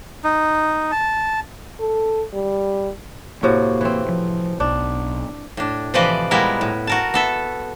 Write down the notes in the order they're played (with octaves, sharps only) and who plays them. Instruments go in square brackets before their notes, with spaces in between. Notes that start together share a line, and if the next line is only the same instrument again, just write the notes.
[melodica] D#4
A5
[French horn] A4
G3
[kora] A2 C3 F#4 [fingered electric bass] A#3
[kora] E3 C4
[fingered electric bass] F3
[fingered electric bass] B1 [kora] D4
[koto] A2 D4
C3 E3 F3 B4 D5 D#5
A#2 G3 G#3 B3 E4 A#4
A2
F#4 A#4 A5
B3 A4 E5